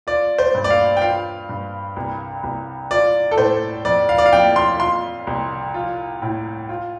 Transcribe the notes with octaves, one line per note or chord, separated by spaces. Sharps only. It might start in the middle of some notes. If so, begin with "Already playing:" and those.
F4 D5
C5
G2
D5
F5
G5
F4 F5
G2
C2
C2
F4 D5
A4
A2 C5
F2 D5
F5
D5
F5
F2 G5
C6
F4 C6
C2
F4
A2
F4